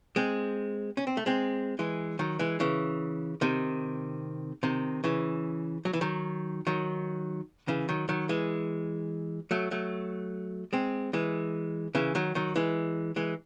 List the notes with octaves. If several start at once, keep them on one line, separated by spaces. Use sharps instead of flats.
G#3 C4
C#4
C4
A3
G#3 C4
E3 G#3
D#3 F#3
E3 G#3
C#3 E3
C3 D#3
C3 D#3
C#3 E3
F#3
E3
D#3 F#3
D#3 F#3
C#3 E3
D#3 F#3
D#3 F#3
E3 G#3
F#3 A3
F#3 A3
G#3 C4
E3 G#3
C#3 E3
D#3 F#3
D#3 F#3
E3 G#3
E3 G#3